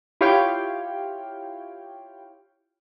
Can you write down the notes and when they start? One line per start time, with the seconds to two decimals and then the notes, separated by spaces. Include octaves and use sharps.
0.21 E4 F4 G4 C#5 F5 G5